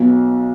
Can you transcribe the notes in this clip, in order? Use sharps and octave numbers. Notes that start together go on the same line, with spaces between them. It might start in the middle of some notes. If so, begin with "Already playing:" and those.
Already playing: B1 B2 F#3